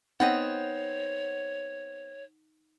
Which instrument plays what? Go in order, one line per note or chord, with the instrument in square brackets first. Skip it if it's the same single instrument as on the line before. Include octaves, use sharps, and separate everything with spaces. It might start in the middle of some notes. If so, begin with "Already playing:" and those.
[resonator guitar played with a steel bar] B3 C4 D#5 [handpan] D#4 [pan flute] C#5 [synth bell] F#5